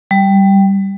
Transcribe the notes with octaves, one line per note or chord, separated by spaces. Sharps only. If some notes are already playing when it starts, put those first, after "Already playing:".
G3